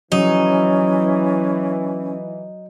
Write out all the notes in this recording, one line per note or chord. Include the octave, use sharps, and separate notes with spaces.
E3 F#3 C#4 D#4